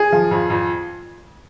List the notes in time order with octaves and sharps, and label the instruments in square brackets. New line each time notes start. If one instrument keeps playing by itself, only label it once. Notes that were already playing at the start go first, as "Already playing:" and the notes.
Already playing: [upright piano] G#4
F3
F2
F2